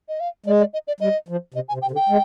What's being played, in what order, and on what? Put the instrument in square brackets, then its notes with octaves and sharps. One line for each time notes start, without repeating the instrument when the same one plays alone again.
[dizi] D#5
F5
[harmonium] G#3 [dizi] D5
[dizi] D5
D#5
D5
[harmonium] G3 [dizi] D#5
[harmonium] F3
[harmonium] C3 [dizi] D#5
[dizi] G#5
[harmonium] C3
[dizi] G5
[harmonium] C3
D3
[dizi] G5
[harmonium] G#3